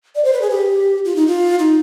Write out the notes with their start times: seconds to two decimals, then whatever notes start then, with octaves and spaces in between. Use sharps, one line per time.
0.15 D5
0.24 C5
0.33 B4
0.42 G#4
0.50 G4
1.05 F4
1.16 D#4
1.27 F4
1.59 D#4